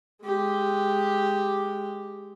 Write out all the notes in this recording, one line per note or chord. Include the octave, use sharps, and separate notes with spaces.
G#3 G4